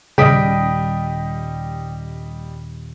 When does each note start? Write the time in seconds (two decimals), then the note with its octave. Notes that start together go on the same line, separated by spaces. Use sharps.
0.18 D#1 C#3 G3 D#5 G5 D#6 B6 D7